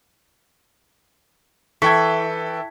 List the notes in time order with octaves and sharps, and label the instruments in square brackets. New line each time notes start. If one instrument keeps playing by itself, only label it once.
[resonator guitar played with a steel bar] E3 [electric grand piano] A4 G5 G#6 [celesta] A5 B6 [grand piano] C#6